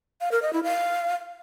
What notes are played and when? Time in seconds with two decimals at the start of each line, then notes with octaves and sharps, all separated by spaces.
0.21 F5
0.32 A#4
0.42 D#5
0.53 E4
0.64 F5